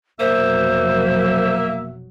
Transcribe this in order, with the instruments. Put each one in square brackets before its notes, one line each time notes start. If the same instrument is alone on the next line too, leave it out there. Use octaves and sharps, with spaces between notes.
[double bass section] F1 B2 F#3 [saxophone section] A#3 E5 [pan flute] C5